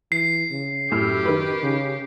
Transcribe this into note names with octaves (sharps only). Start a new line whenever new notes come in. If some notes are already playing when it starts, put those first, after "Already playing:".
E3 C7
C#3
F#2 A2 G4 E6 F6
D#3 B4
C#3